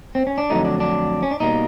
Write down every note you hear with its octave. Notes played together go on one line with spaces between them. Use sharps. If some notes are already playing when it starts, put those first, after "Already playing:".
C4
C#4
D4
F2 D3 F#3 A3 D#4
D4
D4
C#4
D4
B2 G3 A#3 D#4